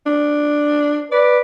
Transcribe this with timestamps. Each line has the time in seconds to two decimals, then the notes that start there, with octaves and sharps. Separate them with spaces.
0.06 D4
1.12 B4 D5